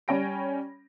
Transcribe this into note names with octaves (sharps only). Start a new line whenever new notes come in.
G3 C#4 C#5 G5 A#6 D7